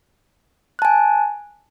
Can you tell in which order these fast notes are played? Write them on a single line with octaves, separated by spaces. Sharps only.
F#6 A5 G#5